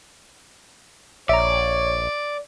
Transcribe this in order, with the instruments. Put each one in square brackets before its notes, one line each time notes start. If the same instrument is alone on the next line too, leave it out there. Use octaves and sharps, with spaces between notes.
[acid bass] A#1 [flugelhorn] C#5 [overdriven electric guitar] D5 [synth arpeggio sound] E5 A#5